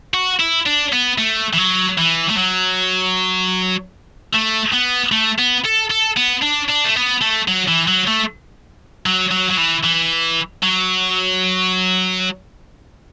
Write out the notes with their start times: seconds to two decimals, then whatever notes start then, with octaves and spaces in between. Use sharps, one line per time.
0.14 F#4
0.40 E4
0.66 D4
0.93 B3
1.18 A3
1.53 E3
1.58 F#3
1.98 E3
2.29 A3
2.37 F#3
4.33 A3
4.73 B3
5.12 A3
5.38 B3
5.65 A4
5.90 A4
6.17 B3
6.43 D4
6.69 D4
6.85 A3
6.96 B3
7.22 A3
7.48 F#3
7.68 E3
7.88 F#3
8.07 A3
9.06 F#3
9.32 F#3
9.51 F#3
9.58 E3
9.84 E3
10.63 F#3